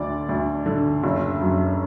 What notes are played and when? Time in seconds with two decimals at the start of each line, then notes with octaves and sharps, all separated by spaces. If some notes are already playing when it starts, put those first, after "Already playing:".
Already playing: D2 D3 D5
0.29 D2
0.66 D3
1.04 F#1
1.41 F#2